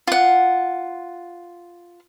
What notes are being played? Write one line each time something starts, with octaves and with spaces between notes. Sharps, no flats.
F4 F#5